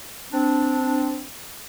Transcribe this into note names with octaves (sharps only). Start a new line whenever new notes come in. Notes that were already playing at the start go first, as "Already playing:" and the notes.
C4 D4